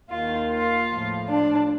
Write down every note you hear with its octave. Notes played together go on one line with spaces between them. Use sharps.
D#2 D#3 F4
F4
A2 F3
D4